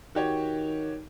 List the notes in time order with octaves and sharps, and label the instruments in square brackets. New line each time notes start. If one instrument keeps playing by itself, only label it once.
[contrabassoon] D#3 [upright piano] F#4 G4 C#5